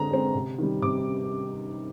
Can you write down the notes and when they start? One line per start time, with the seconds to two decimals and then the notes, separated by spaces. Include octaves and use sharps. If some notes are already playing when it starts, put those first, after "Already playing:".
Already playing: D3 G#3 C4 A#5
0.11 G#3 C4
0.34 C3
0.59 D#3 G3
0.82 C3 D6